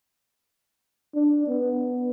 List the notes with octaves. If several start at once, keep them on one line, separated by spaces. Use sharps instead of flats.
D4
B3